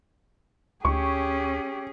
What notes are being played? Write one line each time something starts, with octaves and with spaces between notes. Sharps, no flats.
D2 C#4 G4 G#4 C#6